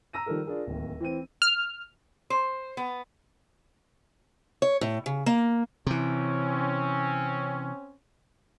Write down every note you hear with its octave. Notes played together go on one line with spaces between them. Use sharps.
A#5 E6 A#6 D#7
D#3 F3 G3 A4 A#4
D4 F4 G#4 A#4
D1 D#2
E3 C4 D#7
F6
C5
B3
C#5
A2
C#3
A#3
C3 E3 C4 C#4